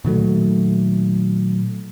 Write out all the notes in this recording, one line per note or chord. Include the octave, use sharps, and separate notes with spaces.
A#2 D#3 F#3 A3